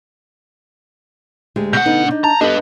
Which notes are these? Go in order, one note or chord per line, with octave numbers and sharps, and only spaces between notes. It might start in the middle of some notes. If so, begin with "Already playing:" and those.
D2 G#3 G4
B2 F#5 G6
D3 B3 D#4
D4 D#4
A5 A#5
B3 D4 G4 A4 B4 D#5